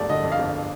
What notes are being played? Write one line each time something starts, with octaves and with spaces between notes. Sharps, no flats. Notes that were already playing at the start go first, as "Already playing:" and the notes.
Already playing: G1 C2 F2 A3 D5
D3 D#5
F2
F5
G1